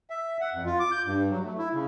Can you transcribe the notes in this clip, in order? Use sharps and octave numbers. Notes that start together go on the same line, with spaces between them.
E5
F#5
F2
F4
D6
G6
G2
F#3
A3
E4
C#3